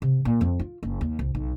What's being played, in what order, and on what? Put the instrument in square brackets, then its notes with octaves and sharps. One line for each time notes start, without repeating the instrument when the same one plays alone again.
[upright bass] C3
A#2
F2
F4
F#1
D#2
C2
B1